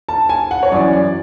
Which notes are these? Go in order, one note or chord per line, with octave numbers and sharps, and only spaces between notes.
A5
G#5
F#5
C#5
F#2 E3 D5
D5